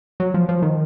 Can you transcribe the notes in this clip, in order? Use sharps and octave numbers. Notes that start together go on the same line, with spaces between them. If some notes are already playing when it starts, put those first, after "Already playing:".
F#3
F3
F3
D#3